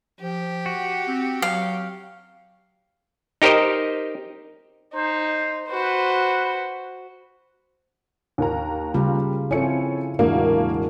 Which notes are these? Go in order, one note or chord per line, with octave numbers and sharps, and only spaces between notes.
F3 G4
F#4
C4
F#3 F5
D#4 G4 A#4 C5 D#5
D#4 C5
F#4 B4 C5
D#2 A#4 A#5
C#3 G3 F4
C4 E4 F4 A4 C#5 G#5 C#7
E1 A2 A#3 D4 F#4